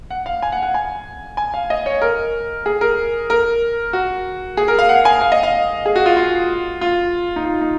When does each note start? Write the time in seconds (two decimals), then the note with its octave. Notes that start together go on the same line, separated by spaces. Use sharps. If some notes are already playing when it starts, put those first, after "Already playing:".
0.10 F#5
0.26 F5
0.42 G#5
0.52 F#5
0.63 F#5
0.74 G#5
1.37 G#5
1.54 F5
1.70 D#5
1.86 C#5
2.01 A#4
2.66 G#4
2.81 A#4
3.30 A#4
3.93 F#4
4.57 G#4
4.68 A#4
4.79 F5
4.89 F#5
5.05 G#5
5.21 F5
5.32 D#5
5.43 F5
5.86 G#4
5.96 F#4
6.06 F4
6.17 F4
6.81 F4
7.36 D#4
7.45 F4
7.61 D#4